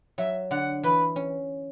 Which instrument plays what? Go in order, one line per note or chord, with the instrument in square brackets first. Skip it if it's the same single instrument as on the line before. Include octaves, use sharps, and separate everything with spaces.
[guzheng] F#3 [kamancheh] E5
[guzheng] D3 [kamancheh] F#5
[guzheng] E3 [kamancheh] B4
[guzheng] C#4